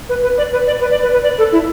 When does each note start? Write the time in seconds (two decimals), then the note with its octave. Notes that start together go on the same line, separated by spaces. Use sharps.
0.09 B4
0.23 B4
0.37 D5
0.52 B4
0.67 D5
0.81 B4
0.91 D5
1.03 B4
1.13 B4
1.23 D5
1.38 A4
1.52 E4